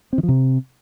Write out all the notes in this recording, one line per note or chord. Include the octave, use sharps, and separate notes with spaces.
C4
D#3
F3
C3